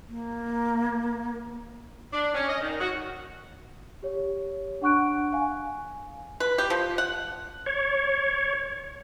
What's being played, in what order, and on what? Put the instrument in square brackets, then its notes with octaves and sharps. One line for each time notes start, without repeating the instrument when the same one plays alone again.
[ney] A#3
[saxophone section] D4
C#4
D#5
D#3
F#4
[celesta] G4 C#5
D4 F#5 C#6 F#6 D7
F5 G#5
[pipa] B4
G4
F3
F#5
[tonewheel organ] C#5